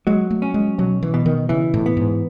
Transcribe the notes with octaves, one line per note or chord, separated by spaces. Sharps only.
F#3 G#3
A3
C#4
G#3
B1 F#3
E3
B2
D#3
C#3 E3
A2
B3
G#2